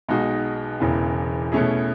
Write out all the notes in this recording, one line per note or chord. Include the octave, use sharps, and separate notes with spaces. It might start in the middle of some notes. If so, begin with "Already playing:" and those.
B1 B2 G#3 D#4 F#4
E1 E2 C#3 E3
B2 A3 C#4 E4 G#4